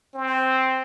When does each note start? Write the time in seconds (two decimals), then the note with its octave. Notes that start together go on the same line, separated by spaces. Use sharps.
0.14 C4